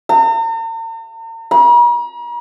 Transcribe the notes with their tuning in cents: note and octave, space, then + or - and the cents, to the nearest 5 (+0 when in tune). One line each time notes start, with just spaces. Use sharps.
A#5 -45
A#5 +45